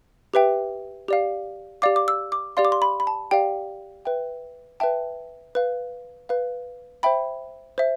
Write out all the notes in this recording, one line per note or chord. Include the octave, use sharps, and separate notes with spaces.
G4 B4 E5 G5
G4 D5 F5
G4 D5 F5 D6
D6
E6
D6
G4 D5 F5 C6
D6
C6
B5
B5
A5
G4 D5 F5 G5
B4 E5 G5
B4 E5 G5 A5
B4 F5
B4 F5
C5 E5 G5 B5
C5 E5